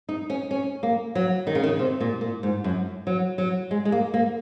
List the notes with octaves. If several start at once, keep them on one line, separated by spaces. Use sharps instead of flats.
D#4
C#4
C#4
A#3
F#3
D#3
C#3
D#3
C3
A#2
A#2
G#2
F#2
F#3
F#3
G#3
G#3
A#3
A#3